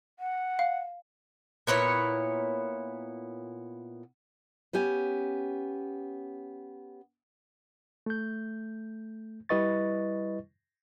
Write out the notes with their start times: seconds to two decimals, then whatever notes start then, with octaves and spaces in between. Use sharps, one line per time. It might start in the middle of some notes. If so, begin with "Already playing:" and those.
0.19 F#5
0.59 F5
1.67 A#2 B3 E4 C#5
4.73 B3 C#4 G4 G#5
8.06 A3 G6
9.49 G3 E4 B4 D#5 C#6 A6